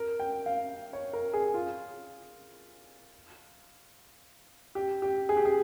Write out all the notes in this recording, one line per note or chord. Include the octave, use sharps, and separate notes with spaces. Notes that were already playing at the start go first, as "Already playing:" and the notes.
Already playing: A#4
G5
F5
C#5
A#4
G#4
F4
G4
G4
G#4
G4
G#4